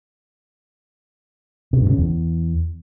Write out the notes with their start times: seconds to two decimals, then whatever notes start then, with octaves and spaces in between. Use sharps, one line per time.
1.73 C3
1.81 G2
1.90 C#3
1.98 E2